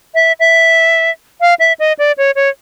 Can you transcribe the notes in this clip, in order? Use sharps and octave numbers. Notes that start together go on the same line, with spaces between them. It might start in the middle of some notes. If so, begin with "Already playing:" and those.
E5
E5
F5
E5
D#5
D5
C#5
C#5